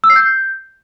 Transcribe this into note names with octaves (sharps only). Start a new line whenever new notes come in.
E6
C7
G6